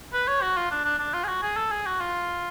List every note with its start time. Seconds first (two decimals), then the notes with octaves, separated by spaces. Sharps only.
0.13 B4
0.28 C#5
0.42 F#4
0.56 F4
0.71 D4
0.85 D4
0.99 D4
1.14 F4
1.24 G#4
1.28 F#4
1.42 G#4
1.57 A4
1.72 G#4
1.86 F#4
2.00 F4